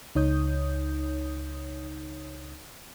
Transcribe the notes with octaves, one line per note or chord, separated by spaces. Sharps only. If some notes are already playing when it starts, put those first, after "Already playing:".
C#2 D#4 C#5 D#6 G6